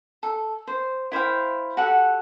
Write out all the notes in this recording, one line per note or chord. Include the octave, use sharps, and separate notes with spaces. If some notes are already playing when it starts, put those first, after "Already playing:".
A4
C5
E4 C5 F5 G5
F#4 G4 A4 F#5